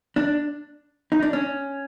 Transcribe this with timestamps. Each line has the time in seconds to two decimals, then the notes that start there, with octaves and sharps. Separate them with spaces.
0.16 D4
1.12 D#4
1.23 D4
1.33 C#4